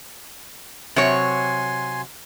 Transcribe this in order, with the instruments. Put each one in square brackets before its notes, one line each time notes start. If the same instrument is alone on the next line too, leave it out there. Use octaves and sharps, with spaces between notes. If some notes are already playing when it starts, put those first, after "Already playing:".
[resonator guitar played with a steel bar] C3 F#3 C#5 [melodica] G#5 C6